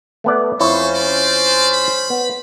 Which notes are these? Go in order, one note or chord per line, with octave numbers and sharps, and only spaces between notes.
A3 B3 D5
F2 C#4 E4 A4 C5 C#5
D5
B5
B3